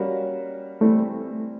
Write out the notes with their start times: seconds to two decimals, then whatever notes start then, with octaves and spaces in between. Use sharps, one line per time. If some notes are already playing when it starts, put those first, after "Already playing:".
Already playing: G3 A#3 C#4 F#4 A#4
0.80 E3 G3 A3 C4